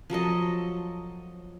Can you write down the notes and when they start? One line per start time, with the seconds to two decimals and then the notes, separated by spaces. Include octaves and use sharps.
0.10 F3 F#3 A4 D#5